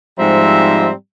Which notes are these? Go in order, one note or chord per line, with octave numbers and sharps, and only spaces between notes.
G#2 F3 G3 C4 E5 A#5